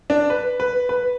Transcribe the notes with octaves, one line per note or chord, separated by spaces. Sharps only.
D4
B4
B4
B4